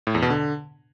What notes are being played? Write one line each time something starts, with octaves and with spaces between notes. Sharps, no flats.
A2
E2
B2
D3